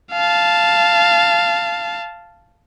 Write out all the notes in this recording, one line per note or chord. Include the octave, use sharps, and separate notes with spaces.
F5 A5